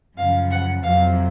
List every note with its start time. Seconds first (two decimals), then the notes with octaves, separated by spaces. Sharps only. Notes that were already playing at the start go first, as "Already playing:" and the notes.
0.18 F#2 C#3 F3 F5
0.51 F#5
0.84 F2 C3 F#3 C4 F5